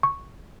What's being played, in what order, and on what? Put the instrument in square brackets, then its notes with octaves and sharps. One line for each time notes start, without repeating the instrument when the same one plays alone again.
[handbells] C#6